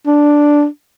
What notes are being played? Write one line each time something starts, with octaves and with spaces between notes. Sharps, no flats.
D4